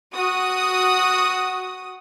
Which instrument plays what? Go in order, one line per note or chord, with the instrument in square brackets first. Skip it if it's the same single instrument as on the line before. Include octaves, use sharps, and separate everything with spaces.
[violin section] F#4 D#6